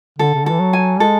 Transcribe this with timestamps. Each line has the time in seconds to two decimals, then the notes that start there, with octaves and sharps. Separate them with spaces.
0.19 D3 A4
0.34 C#3
0.43 D3
0.46 E3 A4
0.60 F#3
0.73 G#5
1.00 G#3 A4